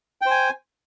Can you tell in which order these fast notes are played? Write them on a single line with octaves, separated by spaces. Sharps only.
G5 C5 G#5